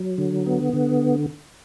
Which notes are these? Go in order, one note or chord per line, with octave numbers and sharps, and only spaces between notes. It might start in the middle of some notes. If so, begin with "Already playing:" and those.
Already playing: F#3
D3
B3
D3